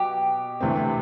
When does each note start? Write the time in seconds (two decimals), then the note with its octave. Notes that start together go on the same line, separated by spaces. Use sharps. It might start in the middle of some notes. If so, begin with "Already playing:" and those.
Already playing: B2 F#3 G4
0.61 D2 C3 E3 A3 C4